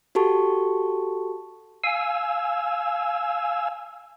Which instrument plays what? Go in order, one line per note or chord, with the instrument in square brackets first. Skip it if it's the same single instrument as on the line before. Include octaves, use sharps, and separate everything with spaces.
[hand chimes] F#4 G4 A4 A5 C#6
[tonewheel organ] F5 G#5 E6